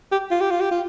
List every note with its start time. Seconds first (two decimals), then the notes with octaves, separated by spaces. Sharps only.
0.12 G4
0.31 F4
0.41 G4
0.51 F4
0.61 G4
0.71 F4